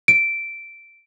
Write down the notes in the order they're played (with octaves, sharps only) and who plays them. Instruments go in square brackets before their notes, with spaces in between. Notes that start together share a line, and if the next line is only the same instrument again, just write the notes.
[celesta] D7